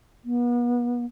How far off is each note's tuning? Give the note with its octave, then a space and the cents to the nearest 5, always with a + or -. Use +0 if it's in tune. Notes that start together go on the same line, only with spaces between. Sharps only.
B3 -40